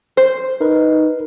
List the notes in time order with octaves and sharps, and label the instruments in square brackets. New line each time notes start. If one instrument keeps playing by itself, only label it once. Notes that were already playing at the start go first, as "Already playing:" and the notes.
[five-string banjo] C5
[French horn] D#4 [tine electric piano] A#4 B4